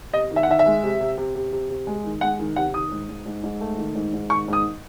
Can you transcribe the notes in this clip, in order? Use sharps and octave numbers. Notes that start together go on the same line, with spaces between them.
C3 D#5
D#3
E5
F#5
D#3 E5
E5
G#3
C3
C3
C3
C3
C3
C3
G#3
D#3
G#3 F#5
D#3
C3 F#5
D#3 D#6
G#2
G#2
G#2
G#2
A3
D#3
G#2
G#2
D#3 C#6
G#2 D#6